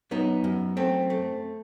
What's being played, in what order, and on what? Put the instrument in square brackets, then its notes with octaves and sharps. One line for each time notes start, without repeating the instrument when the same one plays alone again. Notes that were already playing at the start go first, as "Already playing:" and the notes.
[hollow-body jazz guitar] F#2 B3 D#4
F#2
A3 C4
A3